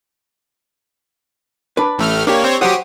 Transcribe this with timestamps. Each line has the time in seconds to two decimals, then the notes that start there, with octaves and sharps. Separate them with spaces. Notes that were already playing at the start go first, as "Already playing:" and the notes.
1.77 D4 B4
1.98 A1 A3 F6
2.27 A#3 D4 G4 C#5
2.44 C4 C5 C#5
2.61 F#3 G4 C5 F#5 D#6